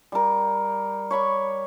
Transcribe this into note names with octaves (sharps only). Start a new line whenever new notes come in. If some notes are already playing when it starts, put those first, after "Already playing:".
G3 A#4
C#5 B5 C#6 D6